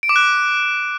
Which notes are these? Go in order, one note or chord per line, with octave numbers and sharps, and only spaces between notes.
D7
D6
F#6